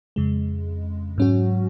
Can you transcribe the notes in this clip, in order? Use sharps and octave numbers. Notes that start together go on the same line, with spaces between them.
F2 C#3 G#3
G#2 F#3 C#4 F#4